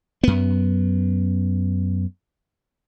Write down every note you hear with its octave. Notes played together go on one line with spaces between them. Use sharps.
F#2 B3